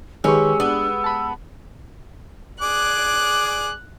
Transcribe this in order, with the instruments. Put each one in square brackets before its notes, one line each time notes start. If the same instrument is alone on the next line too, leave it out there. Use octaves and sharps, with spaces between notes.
[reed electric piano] D#3 B4 C#6 [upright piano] G#3 G4 [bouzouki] C#4 [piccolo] E6
[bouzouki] B3 [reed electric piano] D4
[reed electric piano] A5 B5
[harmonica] G#4 D5 D6 [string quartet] F#6